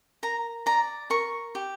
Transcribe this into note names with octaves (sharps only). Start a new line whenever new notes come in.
A#4 A#5
D5 A#5
A#4 C#6
G4